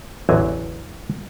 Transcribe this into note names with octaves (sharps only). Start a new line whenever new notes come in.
A1 E2 D3 F#3 G#5